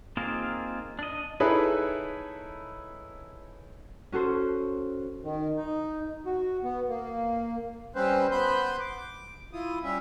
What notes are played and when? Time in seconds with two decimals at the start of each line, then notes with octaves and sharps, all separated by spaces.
0.17 A#3 C4 D#4 F4 G#4
0.99 D4 D#5
1.40 D#4 E4 G#4 A4 B4 C#5
4.12 C#4 F#4 A4 C5
5.23 D#3
5.57 D#4
6.26 F#4
6.64 B3
6.89 A#3
7.95 G3 C4 C#4 B4 C5
8.31 B3 B4 C5 B5 C6 G6
8.80 D6
9.53 E4 F4 D#6
9.83 G3 C#4 E5